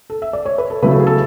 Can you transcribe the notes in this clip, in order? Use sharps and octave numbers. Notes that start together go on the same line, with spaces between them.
A4
E5
D5
C#5
B4
A4
C#3 F#3 A3 E4 B4
A4
G#4
A4